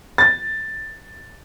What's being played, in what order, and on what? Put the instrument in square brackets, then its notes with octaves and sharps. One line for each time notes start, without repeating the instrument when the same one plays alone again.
[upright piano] A6